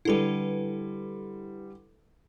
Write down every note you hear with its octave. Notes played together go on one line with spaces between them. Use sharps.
D3 G3 E4 A4 B4